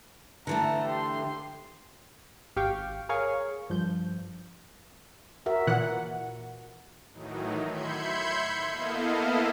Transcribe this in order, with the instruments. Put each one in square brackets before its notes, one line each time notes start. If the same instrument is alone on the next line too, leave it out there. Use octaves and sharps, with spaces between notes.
[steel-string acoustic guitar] D3 E3 A3 [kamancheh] A5 A#5
[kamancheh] G4 C6
[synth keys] G#1 G4 F5 G5 C#6
G#4 A#4 C#5 F5 C#6
G2 F3 G6
[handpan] F#4 A#4 E5
[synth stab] A#2 E3 F#5
[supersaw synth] A2 D#3 E3 F#3 D#4
E5 B5 C6 G6 G#6 C#7
A#3 B3 E4 A4 D#5 F5